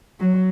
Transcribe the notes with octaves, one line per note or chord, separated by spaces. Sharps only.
F#3